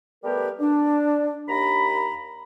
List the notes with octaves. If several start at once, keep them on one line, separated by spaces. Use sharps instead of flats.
G3 A3 B3 G4 A#4 B4
D4
D#2 A#5 B5